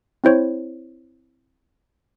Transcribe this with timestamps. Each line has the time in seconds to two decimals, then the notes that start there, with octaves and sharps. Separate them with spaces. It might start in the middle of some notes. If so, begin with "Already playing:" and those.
0.24 C4 E4 C5 C#5